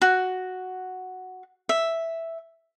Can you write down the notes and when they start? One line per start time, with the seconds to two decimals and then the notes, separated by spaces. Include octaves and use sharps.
0.02 F#4
1.69 E5